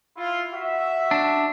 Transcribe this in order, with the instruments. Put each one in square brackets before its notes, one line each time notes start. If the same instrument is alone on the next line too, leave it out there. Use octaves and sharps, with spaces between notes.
[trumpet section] E4 F4
F#4 E5
[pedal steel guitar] D4